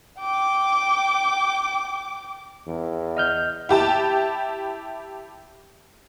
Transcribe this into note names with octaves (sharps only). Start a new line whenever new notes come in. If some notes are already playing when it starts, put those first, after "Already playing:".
G5 D6
E2
D#5 F6 G6
E4 G4 A5